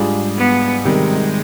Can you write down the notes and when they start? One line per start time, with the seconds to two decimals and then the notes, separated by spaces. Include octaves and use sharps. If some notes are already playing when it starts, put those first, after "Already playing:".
Already playing: G#2 G3 D4 F4 G#4
0.37 B3
0.84 C3 D#3 G3 G#3